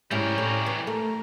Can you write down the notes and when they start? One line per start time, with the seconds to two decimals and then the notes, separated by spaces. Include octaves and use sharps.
0.11 G#2 C3 G3 C#4 E4 G4 A#4
0.38 A2
0.66 E3
0.87 A3 A#4